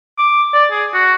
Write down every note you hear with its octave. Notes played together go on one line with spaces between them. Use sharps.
D6
D5
G#4
F#4